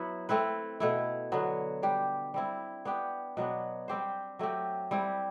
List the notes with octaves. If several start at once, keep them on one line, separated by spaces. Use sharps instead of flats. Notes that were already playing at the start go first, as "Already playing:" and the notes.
Already playing: F#3 B3 E4 B4
A3 C4 E4 B4
B2 A3 E4
D3 F#3 B3
G3 D4 G4
G3 C4 E4
B3 D4 G4
B2 F#3 B3 D4
G3 C4 G4 C5
F#3 A3 C4 G4
G3 C4 E4 G4